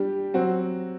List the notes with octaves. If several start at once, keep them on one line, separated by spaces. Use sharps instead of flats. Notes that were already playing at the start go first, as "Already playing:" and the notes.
Already playing: G3 D4 G4
F#3 C4 F#4